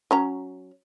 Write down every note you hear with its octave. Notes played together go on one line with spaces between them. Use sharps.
F#3 C#4 A#5